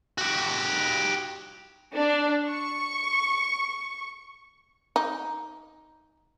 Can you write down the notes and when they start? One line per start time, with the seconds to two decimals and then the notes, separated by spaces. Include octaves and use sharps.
0.18 F#4 G4
1.94 D4
2.49 C#6
4.96 D#4